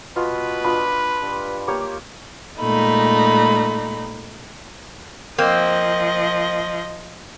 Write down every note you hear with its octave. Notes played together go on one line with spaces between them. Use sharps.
B2 F4 B4
D4 F4 D#5 B5
G2
A#3 G4 C#5
A#2 G#3 A3 D#4 B5
F3 A#3 C4 D#5